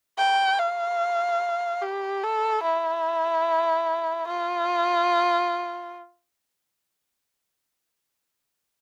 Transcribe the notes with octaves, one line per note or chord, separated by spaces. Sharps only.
G5
F5
G4
A4
E4
F4